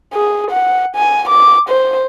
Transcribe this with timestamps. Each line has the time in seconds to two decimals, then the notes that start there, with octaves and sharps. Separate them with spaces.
0.14 G#4
0.51 F#5
0.96 G#5
1.29 D6
1.69 C5